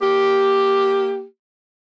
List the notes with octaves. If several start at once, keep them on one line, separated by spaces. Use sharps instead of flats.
A#3 G4